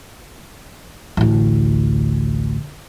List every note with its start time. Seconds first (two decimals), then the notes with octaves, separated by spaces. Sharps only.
1.17 A1 D2